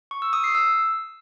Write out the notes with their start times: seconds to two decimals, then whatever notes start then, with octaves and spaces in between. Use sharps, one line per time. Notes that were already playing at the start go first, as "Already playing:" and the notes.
0.11 C#6
0.22 E6
0.33 D#6
0.44 C7
0.55 E6